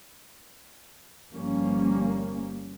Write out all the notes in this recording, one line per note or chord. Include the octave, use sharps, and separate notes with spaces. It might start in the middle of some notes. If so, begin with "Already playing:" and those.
G1 F3 G3 A#3 C#4